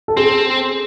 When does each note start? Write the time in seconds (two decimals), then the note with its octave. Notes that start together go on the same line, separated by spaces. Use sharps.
0.08 A4
0.17 C4 G#4